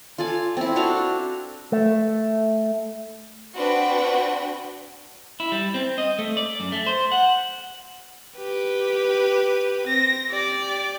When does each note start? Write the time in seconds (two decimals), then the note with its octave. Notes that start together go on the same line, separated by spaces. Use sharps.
0.18 F4 A4 D5 G#5
0.57 C4 E4
0.76 D4 F#4 A4 F5
1.72 A3
3.55 C4 D4 F#4 B4 G5
5.40 E4
5.52 G3
5.74 C4
5.98 D#5
6.19 A3
6.37 D5
6.60 F#2
6.72 A3
6.86 C5
7.12 F#5
8.38 G4 B4
9.87 C4 A#6
10.31 G4 D5